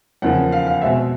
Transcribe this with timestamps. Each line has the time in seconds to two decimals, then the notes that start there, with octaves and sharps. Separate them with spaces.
0.22 E2 C#3 F3 A#3 F#5
0.52 F5
0.67 F5
0.82 B2 G#3 C4 E5